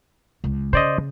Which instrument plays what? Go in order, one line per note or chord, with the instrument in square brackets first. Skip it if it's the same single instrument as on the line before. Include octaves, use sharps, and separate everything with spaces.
[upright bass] C#2
[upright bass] C#3 [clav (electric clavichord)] C5 D5 D#5